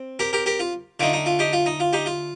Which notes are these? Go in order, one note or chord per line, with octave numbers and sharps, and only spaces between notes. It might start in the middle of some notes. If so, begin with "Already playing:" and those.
Already playing: C4
G4 A#4
G4 A#4
G4 A#4
F4
D3 A3 D#4 F4
D#4
F4
D#4 G4
F4
D#4
F4
D#4 G4
F4